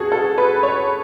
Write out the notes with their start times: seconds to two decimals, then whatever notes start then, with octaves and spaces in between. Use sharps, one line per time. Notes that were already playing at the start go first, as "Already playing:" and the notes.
Already playing: E2 C#3 G#3 F#4 G#4 A4
0.12 A4
0.38 B4
0.63 C#5